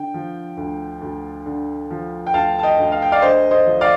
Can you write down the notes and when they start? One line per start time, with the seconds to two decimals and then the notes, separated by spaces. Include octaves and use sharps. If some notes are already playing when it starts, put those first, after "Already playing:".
Already playing: D3 G5
0.14 F3
0.57 D2
1.01 D2
1.46 D3
1.90 F3
2.27 G5
2.34 D2 F5 A5
2.59 A5
2.63 D#5 G5
2.78 D2
2.92 F5
3.02 G5
3.12 D5 F5
3.22 D3 C5 D#5
3.51 C5 D#5
3.66 F3
3.81 D5 F5